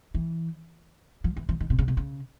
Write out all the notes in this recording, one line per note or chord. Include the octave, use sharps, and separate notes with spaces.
E3
F3
E3
E3
D#3
C3
C#3
C3
C#3